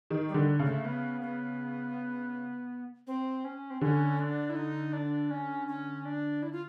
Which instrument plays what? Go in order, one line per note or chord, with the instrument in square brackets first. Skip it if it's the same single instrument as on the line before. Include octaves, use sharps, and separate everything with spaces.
[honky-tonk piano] D#3
[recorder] G3
[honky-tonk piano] D3
C#3
[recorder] A3
B3
B3
C4
C#4
C4
[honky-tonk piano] D3 [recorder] C#4
[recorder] D4
E4
D#4
D4
C#4
C#4
D4
E4
F4